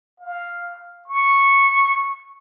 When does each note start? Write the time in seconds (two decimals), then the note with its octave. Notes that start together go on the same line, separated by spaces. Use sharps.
0.20 F5
1.07 C#6